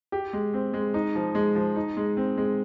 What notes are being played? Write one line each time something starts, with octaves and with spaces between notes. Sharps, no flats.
G4
G#3
C4
G#3
D#4
F3
G#3
F3
D#4
G#3
C4
G#3